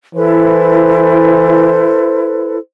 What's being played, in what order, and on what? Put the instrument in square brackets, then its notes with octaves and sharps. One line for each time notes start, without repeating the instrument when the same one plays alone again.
[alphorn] E3 [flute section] E4 A4 B4 [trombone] C5